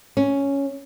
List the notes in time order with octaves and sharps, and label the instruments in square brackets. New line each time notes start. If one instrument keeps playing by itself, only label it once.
[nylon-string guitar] C#4